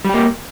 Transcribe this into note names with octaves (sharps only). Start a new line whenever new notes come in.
G3 A#3 G4